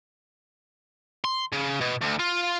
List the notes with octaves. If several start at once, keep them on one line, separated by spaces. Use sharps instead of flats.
C6
C#3
B2
D2
F4